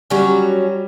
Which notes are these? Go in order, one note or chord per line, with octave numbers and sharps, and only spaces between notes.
F#3 G3 C#4 F#4